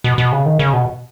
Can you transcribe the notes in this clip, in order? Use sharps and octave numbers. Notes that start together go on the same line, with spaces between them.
B2
B2
C#3
D#3
C#3
B2